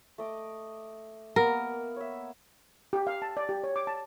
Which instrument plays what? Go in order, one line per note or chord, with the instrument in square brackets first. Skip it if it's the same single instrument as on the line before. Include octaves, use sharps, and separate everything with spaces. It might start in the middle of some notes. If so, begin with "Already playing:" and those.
[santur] A3 D#5 D6
[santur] A#3 B3 [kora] A#4
[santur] C#5 E5
[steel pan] G4
F5
A5
D5
G4
C#5
D6
A5